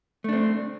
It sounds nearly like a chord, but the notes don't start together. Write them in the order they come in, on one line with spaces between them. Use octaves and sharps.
A3 D4 C4